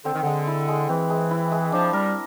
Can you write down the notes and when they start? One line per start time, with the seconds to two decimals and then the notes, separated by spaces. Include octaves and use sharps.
0.05 D3 C4
0.14 D#3
0.23 D3 G#3
0.47 E4
0.68 G#3
0.88 E3 C4
1.10 G#3
1.31 E4
1.52 G#3
1.72 F3 D4
1.93 G3 A#4